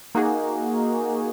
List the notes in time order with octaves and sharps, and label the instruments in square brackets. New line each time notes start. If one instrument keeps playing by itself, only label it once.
[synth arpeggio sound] A#3 D#4 F#4 G#4